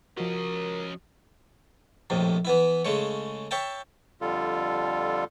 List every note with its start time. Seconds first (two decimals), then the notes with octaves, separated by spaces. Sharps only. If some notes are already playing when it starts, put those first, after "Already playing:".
0.17 F3 C#4 F#4 A#4 D#5
2.10 A#1 F2 A2 C3
2.45 E3 B3 E4
2.85 C#3 G#3 A3 C#5
3.51 C#5 E5 G5 A5
4.21 F2 D3 G3 F4 A4